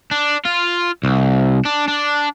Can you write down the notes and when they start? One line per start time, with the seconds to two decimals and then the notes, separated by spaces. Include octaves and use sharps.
0.11 D4
0.45 F4
1.03 C2
1.65 D4
1.88 D4